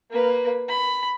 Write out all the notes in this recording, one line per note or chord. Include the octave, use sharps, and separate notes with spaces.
A#3 B4
B5